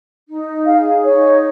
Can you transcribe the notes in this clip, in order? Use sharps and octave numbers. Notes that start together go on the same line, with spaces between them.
D#4
G#4 F5
D#4 C#5